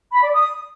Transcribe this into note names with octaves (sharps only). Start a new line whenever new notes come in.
B5
D5
D#6